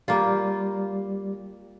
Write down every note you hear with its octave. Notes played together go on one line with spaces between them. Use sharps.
G3 A#3 F4